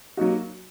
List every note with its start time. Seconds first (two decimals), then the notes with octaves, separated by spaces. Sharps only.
0.17 F#3 A#3 D#4 F#4